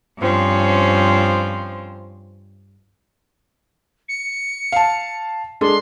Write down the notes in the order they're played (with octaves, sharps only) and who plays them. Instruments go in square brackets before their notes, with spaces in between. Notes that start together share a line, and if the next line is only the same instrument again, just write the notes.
[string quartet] G2 F3 C4 C#4
[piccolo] C#7
[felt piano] F5 A5
[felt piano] G#3 D4 A4 [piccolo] C6